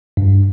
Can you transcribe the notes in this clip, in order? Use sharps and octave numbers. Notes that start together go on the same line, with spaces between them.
G2